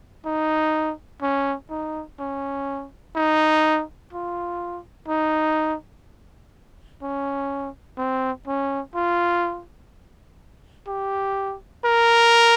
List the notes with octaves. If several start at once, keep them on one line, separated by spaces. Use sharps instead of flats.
D#4
C#4
D#4
C#4
D#4
F4
D#4
C#4
C4
C#4
F4
G4
A#4